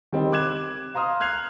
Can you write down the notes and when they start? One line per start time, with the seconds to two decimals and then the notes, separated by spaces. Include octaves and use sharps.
0.12 D#3 G3 C4 D#4
0.32 D6 F#6 G#6 E7
0.95 F5 A#5 C6 D#6 F6
1.20 F6 F#6 G#6 C7 F7